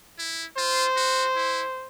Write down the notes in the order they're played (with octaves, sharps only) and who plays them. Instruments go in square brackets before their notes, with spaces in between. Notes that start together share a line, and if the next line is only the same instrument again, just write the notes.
[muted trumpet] E4
[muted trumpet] F4 [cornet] C5
[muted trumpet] F#4
E4